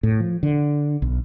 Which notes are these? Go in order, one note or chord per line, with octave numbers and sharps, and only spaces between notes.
A2
F3
D3
B1